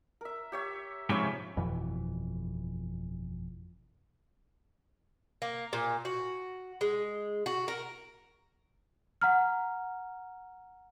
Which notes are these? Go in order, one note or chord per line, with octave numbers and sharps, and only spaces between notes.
A#4 E5
G4 C#5 E5
G#2 C3 F3 C#4 C#5 B5
G1 F2 B2 E3
A#3
A#2
F#4
G#3
F#4
A#4
F#5 A#5 F6